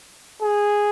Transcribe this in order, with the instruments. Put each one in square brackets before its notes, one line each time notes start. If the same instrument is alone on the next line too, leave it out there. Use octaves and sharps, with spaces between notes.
[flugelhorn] G#4